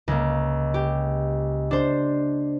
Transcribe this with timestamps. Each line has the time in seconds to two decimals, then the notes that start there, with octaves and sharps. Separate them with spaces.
0.08 C#2 A#3
0.74 G4
1.71 D4 C5